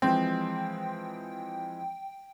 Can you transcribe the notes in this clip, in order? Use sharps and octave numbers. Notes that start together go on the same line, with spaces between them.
E3 F3 G#3 C4 G5